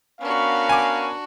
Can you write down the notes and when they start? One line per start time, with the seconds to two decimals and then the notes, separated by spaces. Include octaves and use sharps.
0.21 B3 C#4 D4 F#4 A#4 F5
0.69 G#5 D6